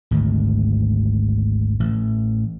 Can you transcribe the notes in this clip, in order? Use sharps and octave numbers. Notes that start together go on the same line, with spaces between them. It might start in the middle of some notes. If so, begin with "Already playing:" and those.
G#1 D2
A1